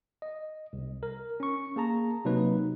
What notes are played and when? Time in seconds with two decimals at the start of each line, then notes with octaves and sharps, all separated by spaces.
0.22 D#5
0.73 C2
1.03 A#4
1.40 C#4 C#6
1.76 A#3 G#4 A5 A#5
2.25 C3 F#3 A#3 D#4 B4